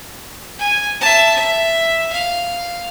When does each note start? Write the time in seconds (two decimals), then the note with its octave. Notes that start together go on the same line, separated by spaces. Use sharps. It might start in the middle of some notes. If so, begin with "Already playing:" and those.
0.58 G#5
1.01 E5 A5
1.35 E5
2.12 F5